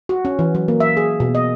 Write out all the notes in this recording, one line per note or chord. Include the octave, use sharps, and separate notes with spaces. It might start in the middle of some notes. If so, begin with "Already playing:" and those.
F#4
C#4
E3
F#3
A#3
E5
G#4
B2
D#5